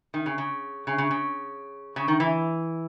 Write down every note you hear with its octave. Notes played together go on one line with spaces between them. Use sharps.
D#3
C#3
C#3
C#3
C#3
C#3
C#3
D#3
E3